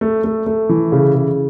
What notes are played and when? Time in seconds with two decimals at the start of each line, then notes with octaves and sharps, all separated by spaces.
0.01 A3
0.24 A3
0.46 A3
0.69 E3
0.92 C#3
1.15 C#3